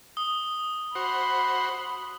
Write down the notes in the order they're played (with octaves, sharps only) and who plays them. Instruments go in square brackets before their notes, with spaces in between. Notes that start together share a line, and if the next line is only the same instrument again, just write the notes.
[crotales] D#6 G7
[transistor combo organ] F#4 C5 [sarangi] B5